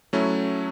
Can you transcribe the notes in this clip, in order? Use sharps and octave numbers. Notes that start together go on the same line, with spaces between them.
F#3 A3 C#4 E4